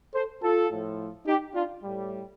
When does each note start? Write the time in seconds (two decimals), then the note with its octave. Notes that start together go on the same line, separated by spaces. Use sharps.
0.14 A4 C5
0.42 F4 A4
0.71 A2 F3
1.26 D#4 G4
1.54 D4 F4
1.83 A2 G3